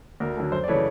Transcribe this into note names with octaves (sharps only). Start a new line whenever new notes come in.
D2 A#4
D3 F#3 A3
F#2 C5
D5
C#3 E3 A3 C#5